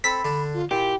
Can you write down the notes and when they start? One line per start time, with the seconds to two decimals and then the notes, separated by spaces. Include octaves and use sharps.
0.04 C4 A4 B5 B6
0.25 D3 D4
0.53 F4
0.71 A#2 E4 G4